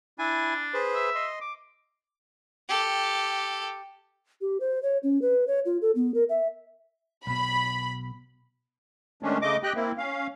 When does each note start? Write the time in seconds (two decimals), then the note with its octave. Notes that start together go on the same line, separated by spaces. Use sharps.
0.19 D4 E4 G#5
0.74 G#4 B4 C5
0.94 E5
1.15 D#5 C6
1.41 D6
2.69 G4 A4
4.41 G4
4.60 C5
4.83 C#5
5.03 C#4
5.22 B4
5.47 C#5
5.65 F4
5.82 A4
5.95 B3
6.14 A#4
6.29 E5
7.27 B1 B2 B5
9.23 D#3 G#3 A3 C#4 D4
9.42 C#3 A3 D#5 D6
9.63 G4 D#5 G5 F#6
9.75 A#3 C4 E4
9.98 C#4 F5